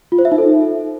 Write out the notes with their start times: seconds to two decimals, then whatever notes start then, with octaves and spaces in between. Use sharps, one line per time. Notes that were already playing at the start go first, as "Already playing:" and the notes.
0.12 F4
0.19 C5
0.25 E5
0.32 D#4
0.38 A4